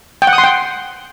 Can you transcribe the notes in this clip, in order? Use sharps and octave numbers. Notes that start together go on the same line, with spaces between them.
G5
F#5
D#6
C6
G5